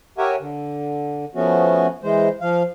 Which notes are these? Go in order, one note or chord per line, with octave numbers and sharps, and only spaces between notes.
G4 A#4 C#5 E5 F#5 G#5
D3
F3 A3 B3 C#4 F#4
E3 G#3 C5
F3 F5